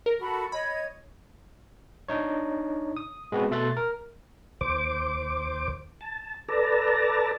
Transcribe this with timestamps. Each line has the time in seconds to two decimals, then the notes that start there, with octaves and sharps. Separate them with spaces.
0.06 A#4
0.19 F#4 A4 B5
0.52 C#5 D#5 B5 G#6
2.08 D4 D#4 C#5
2.97 D#6
3.32 G#3 B3 C4 F#4 B4
3.51 B2 A3 E5 C6 F#6 A6
3.77 A#4
4.61 D#2 C5 D6
6.01 A5
6.49 A4 B4 D5 A5 A#5